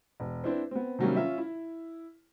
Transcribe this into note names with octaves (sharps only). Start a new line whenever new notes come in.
E1
C4 D4 E4 B4 C5
B3 C4
C3 D#3 F#3 G3 A#3 C#4
C#4 F4 E5
E4